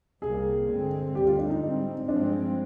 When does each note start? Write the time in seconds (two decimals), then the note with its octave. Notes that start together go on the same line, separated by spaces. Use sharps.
0.22 C2 C3 G3 A#3 G#4
0.68 G2 D3 G#3 C4
1.15 D2 D3 G3 G4
1.27 F4
1.39 D4
1.50 D#4
1.62 G#2 G3 C4
2.08 G2 F3 G#3 C4 D4